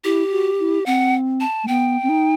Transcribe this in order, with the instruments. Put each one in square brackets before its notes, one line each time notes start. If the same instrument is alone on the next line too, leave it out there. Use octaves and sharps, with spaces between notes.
[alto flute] E4 [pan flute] G4
[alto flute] F#4
E4
[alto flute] C4 [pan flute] F#5
[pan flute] A5
[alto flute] A3
[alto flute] B3 [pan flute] G5
[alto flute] C4
D#4